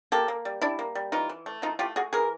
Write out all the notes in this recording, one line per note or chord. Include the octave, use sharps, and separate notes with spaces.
A#3 G4 A4
A#3
G3
G3 D4 E4
A#3
G3
E3 D#4 F4
E3
A3
E3 D#4 F4
A3 F4 G4
A3 F#4 G#4
E3 G#4 A#4